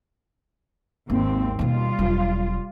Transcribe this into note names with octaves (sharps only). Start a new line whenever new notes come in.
G#1 D#2 C4
D#2 B2 G3 F4
E1 F#3